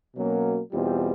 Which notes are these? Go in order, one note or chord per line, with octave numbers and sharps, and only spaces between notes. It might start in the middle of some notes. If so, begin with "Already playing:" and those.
B2 F#3 A#3 C#4
E2 B2 G3 C4 F4